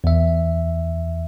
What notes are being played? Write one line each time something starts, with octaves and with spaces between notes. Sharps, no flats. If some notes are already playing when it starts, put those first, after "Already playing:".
E2 E5